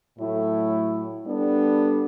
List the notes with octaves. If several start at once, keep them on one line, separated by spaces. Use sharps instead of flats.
A2 F#3 A3 E4
G3 B3 D4 A4